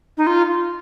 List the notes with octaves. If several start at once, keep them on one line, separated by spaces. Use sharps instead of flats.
D#4
F4